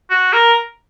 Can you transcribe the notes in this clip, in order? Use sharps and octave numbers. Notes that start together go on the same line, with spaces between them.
F#4
A#4